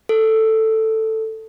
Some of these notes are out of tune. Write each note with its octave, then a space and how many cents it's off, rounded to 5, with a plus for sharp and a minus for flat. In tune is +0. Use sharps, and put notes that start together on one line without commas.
A4 +5